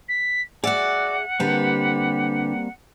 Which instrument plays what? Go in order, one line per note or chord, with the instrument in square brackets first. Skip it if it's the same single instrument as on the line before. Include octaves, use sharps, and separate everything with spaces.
[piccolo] B6
[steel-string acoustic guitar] F#4 D5 [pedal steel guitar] G#4 E5 E6 [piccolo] F#5
[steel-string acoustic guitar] D3 G4 B4 [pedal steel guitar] G3 A#3 C4